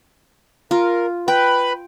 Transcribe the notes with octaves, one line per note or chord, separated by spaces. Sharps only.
F4 A#4
B4 G5 B5